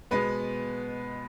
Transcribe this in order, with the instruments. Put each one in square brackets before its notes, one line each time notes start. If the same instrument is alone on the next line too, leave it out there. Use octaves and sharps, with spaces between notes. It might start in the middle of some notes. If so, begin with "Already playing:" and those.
[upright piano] B2 G#3 B3 B4